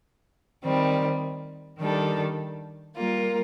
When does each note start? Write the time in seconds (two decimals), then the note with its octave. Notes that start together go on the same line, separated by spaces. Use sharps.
0.64 D#3 G3 C4
1.79 D#3 G3 D4 A4
2.96 G3 A#3 F4 A#4